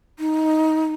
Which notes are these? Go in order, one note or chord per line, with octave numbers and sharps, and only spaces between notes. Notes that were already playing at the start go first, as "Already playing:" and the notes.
D#4